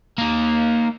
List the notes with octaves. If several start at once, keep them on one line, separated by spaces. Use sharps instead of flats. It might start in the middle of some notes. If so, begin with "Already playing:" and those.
A#3 D#4